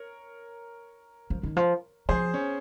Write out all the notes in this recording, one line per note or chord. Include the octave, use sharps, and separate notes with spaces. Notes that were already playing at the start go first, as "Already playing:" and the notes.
Already playing: A#4 C#5
F3
D#3
F3
F3 G#4 C5
C#4